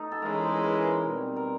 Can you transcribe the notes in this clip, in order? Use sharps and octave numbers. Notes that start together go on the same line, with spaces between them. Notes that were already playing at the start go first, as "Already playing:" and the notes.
Already playing: A3 D#4
A4
E3 G#3 C#4 E4 G#4 A#4
A#4
C5
B4
A#4
B2 G3 C4
A#4